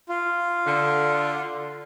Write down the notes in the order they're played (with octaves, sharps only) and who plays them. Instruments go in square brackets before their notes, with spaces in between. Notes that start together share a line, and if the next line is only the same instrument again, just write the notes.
[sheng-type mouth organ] F4
[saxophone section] D3